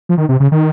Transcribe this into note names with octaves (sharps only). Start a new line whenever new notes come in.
F3
D#3
C3
C#3
D#3